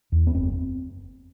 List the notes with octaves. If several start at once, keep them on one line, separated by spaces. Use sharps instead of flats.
E2
B3
F#1 C4